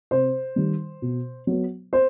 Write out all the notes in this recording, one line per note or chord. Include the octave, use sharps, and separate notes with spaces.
C3 C5
D#3 G3
B2
F#3 B3
C5